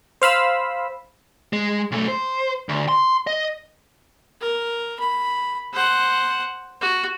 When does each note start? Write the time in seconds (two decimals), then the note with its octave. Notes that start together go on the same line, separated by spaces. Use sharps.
0.22 C5 F5 B5 E6
1.53 G#3
1.91 B1 A3
2.08 C5
2.69 D2
2.88 C6
3.27 D#5
4.41 A#4
4.99 B5
5.73 C5 F#5
6.81 F#4